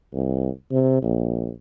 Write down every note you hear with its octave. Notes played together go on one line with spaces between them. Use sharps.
C2
C3
A#1